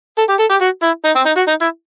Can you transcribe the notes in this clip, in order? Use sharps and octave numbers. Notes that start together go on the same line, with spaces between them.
A4
G4
A4
G4
F#4
E4
D#4
C4
D#4
F#4
D#4
E4